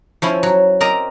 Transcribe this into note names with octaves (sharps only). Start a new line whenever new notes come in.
F3 C#4 E4
F#3
C4 A#4 D5 D#5 A#5